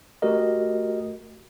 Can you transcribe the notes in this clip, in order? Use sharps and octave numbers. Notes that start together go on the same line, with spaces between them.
A3 F#4 G4 A#4 D#5